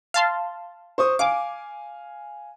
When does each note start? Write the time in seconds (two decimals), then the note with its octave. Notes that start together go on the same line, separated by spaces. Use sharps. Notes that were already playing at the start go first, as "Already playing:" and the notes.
0.14 F5 A5 C6
0.98 C5 C#6 D#6
1.19 F5 G#5 D6